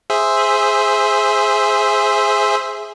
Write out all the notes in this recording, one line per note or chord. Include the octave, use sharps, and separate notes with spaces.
G#4 C5 E5